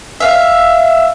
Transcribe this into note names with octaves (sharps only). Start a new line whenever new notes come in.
E5 F5